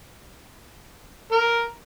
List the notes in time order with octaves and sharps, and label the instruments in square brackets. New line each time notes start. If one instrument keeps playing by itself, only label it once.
[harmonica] A#4